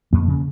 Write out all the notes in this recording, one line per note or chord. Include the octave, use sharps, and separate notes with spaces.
F2 A#3
C#3